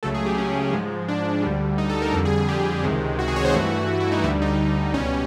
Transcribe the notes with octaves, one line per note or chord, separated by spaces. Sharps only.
C#2 C#3 F#3 A3 A4
G#4
G4
C#4
G#2 F3 G#3
D4
D2 D3 G3
D#4
A4
A#4
F2 D3 G3 A4
G#4
G#4
G4
C#2 C3 D#3 G#3
F#4
G#4
C#5
C5
G2 E3 A3 F#4
E4
D#4
D2 D3 G3 E4
D#4
C#2 B2 G3 C#4